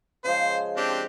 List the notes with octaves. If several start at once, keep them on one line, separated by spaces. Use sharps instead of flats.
C#3 F3 G#3 C5
C4 D4 G4